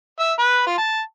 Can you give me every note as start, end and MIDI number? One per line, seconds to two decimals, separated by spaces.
0.20 0.33 76
0.39 0.62 71
0.66 0.77 65
0.78 1.00 81